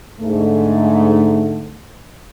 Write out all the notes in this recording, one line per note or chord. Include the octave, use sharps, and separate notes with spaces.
G#2 D3 A3